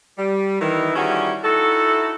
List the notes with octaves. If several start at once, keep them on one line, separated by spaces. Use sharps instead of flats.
G3
D#3 E3
D#3 G3 C#4 E4 F#4 G#4
D#4 E4 F#4 A4